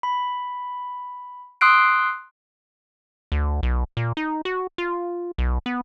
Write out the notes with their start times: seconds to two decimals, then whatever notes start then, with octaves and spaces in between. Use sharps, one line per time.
0.03 B5
1.61 C6 D#6 E6 F#6 C7 D7
3.32 D2
3.63 B1
3.97 A#2
4.17 D#4
4.45 F#4
4.78 F4
5.38 B1
5.66 B3